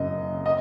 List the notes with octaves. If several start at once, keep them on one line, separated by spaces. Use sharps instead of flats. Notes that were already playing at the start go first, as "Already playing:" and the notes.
Already playing: F#1 F#2 C#3 D#5
D#5